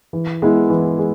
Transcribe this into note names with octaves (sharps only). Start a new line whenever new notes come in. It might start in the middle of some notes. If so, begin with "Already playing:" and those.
E3
G#3 B3 E4
E3
G#3